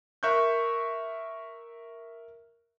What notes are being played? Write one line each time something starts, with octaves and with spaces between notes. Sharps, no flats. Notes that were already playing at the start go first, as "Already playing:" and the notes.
A#4 E5 C#6 F#6 G6